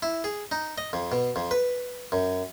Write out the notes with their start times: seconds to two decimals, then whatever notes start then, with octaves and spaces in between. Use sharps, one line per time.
0.02 E4
0.24 G#4
0.51 D#4
0.78 D#5
0.93 F2
1.12 B2
1.36 F2
1.51 B4
2.12 F#2